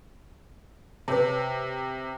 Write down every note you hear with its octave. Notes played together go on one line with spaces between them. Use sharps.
C3 B4 C#5 A5